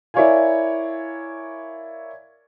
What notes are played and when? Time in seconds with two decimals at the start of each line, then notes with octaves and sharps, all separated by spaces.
0.14 E4 A#4 C#5 D5 F5 G#5